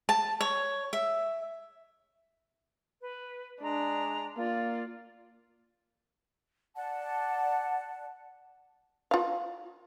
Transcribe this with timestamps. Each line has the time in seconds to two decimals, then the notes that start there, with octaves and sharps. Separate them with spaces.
0.09 A5
0.41 C#5
0.93 E5
3.01 B4
3.62 G#3 D4 A#5
4.37 A#3 F4 D5 F5
6.76 D5 F#5 A5
9.11 F4 F5